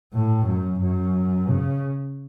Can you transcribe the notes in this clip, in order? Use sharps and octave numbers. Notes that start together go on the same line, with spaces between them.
A2
F#2
F#2
C#3